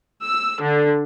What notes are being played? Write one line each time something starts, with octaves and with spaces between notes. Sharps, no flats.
E6
D3